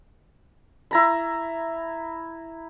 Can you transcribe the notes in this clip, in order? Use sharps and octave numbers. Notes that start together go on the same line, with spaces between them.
E4 A#5 B5